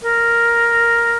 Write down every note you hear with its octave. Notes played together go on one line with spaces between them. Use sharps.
A#4